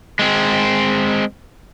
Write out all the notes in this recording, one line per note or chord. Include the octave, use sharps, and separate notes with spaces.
G#3 C4